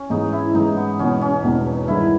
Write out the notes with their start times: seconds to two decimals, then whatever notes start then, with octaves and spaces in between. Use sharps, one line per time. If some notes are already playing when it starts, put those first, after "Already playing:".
Already playing: C#4
0.10 G#2 E3 G#3 D#4
0.33 E4
0.55 G#2 E3 G#3 D#4
0.77 B3
0.99 E1 E2 B2 C#4
1.21 C#4
1.44 E1 E2 B2
1.88 G2 D#3 G#3 E4